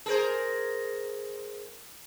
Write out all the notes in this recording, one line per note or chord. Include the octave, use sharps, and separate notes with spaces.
G#4 A#4 C5